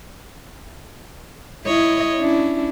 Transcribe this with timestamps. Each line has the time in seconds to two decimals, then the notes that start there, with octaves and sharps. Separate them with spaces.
1.65 E4 C#5 D#5
2.17 C#4 D4 E4